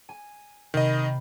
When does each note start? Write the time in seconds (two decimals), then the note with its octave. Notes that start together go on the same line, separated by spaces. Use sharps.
0.09 G#5
0.74 C3 D#3 D#5 B5